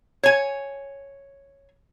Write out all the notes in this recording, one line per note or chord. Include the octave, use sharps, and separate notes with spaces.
C#5 G#5